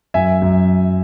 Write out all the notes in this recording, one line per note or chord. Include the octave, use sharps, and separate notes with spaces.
F#2 E5 G#5
F#2